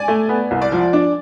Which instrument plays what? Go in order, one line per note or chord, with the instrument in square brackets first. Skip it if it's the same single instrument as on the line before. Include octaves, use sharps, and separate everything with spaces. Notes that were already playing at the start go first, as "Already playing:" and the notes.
Already playing: [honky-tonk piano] D5 G#5
[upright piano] A3
B3
C2
[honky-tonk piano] D5
[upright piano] F3
D4